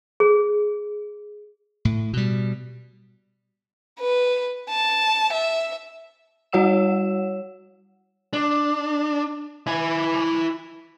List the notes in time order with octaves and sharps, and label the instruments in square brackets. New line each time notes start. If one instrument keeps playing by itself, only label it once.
[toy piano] G#4
[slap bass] A2
B2 G3
[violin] B4
A5
E5
[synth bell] G3 F#4 C#5 F#5 E6 E7
[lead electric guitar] D4
E4 G#5